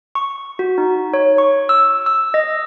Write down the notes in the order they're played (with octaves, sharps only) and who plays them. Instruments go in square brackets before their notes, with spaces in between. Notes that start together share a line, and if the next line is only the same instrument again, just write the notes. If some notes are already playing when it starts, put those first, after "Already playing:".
[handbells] C#6
F#4
D#4
C#5
C#6
E6
E6
D#5